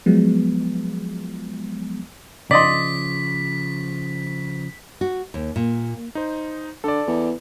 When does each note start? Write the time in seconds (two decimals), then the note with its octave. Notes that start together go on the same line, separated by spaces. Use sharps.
0.06 F3 F#3 G#3 B3
2.51 C#3 F3 D5 D#5 C6 B6
5.01 F#4
5.34 D#2
5.56 A#2
6.15 D#4 C5
6.84 D3 A4 D5
7.07 E2